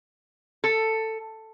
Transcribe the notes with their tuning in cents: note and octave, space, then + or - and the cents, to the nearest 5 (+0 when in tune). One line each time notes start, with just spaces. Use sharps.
A4 +10